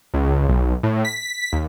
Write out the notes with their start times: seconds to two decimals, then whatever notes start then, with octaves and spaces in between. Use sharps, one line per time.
0.14 C#2
0.49 B1
0.83 A2
1.05 B6
1.53 D#2